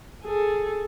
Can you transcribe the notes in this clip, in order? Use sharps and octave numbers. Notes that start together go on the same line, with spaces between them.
G#4 A4